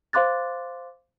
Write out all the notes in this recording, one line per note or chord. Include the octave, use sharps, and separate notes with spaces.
C5 F5 C6 D6 F#6 A6